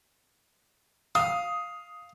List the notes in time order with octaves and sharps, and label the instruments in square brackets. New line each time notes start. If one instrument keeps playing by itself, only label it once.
[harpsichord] F5 [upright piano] D#6